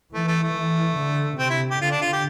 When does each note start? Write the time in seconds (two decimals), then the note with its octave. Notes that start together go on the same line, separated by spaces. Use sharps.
0.14 E3 A3
0.28 A3
0.43 A3
0.56 E3
0.98 D3
1.39 C3 C4
1.50 E4
1.71 G4
1.81 D3 F4
1.91 D4
2.02 F4
2.13 G4